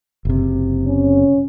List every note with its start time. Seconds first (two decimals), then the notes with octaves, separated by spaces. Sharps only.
0.25 F#1 C3
0.86 C#4